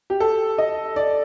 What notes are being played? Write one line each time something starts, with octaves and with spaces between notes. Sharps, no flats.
G4
A4
D#5
D5